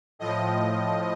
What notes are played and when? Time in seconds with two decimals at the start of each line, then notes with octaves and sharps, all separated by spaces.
0.19 A2 F3 D#5